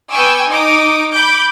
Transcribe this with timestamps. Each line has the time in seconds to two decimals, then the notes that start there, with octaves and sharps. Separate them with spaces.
0.10 B3 G5 G#5 C#6 D6 E6
0.49 D#4 D6 D#6
1.13 B5 D6 G6